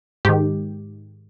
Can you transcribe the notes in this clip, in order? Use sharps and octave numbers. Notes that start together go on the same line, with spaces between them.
G#2 D#3 G4